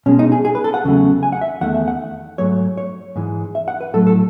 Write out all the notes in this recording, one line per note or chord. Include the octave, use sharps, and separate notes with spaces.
B2 G#3 C#4
D#4
G#4
G#4
B4
A4
F#5
E2 C#3 F#3 A3
G#5
F#5
E5
E2 D#3 A3 F#5
E5
F#5
G#2 F#3 A3 C#5
C#5
G#2 E3 G#3
E5
F#5
B4
A2 F#3 A3 A4
A4